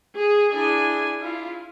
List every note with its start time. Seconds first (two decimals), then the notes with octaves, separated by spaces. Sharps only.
0.15 G#4
0.51 D4 E4 G#4 G#5
1.19 E4 F4